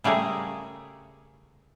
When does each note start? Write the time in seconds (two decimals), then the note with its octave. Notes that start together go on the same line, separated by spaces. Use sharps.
0.04 C#3 G3 A3 G#4 A#4